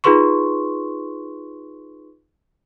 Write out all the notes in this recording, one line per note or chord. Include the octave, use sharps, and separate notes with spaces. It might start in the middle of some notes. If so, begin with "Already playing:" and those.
D#4 F4 G#4 B4 C6 C#6